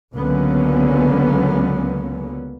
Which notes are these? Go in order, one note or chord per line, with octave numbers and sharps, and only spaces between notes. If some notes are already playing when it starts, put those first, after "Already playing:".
C#2 D3 F#3 A#3 B3 C#4